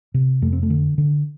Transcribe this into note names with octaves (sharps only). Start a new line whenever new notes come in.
C3
F2 A3
C4
A3
D3
D3